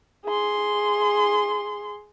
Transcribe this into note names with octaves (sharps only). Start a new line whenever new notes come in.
G#4 C6